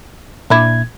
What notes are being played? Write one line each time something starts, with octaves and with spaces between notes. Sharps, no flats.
A#2 D4 E4 G#6